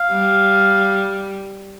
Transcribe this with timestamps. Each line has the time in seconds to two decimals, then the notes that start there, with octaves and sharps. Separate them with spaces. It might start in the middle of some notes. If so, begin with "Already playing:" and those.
Already playing: F5
0.11 G3